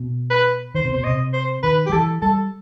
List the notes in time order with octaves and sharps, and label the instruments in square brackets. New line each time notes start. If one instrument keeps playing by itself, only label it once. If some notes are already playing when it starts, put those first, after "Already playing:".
Already playing: [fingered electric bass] B2
[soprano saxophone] B4
[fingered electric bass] D#3 [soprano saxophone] C5
[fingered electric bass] C3
[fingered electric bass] B2 [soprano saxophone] C5
[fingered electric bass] C3 [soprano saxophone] D#5
[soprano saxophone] C5
[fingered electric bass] D#3 [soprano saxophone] B4
[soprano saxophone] G4
[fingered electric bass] F#3
[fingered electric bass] E3 [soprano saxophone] A4
[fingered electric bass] G3 [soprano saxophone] A4